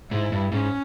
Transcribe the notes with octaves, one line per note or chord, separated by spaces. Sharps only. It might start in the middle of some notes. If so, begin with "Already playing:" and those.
G#2 E4
G2
G#2 C#4